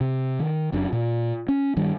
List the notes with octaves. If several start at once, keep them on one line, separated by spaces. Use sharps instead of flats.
C3
D#3
F#1 F#2 F#3 D4
A#2
C#4
G2 D#3 G3